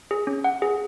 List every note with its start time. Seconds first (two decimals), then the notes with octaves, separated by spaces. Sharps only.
0.11 G#4
0.27 C#4
0.44 F#5
0.62 G#4